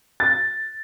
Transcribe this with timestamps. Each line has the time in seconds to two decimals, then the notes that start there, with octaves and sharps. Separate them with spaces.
0.20 A6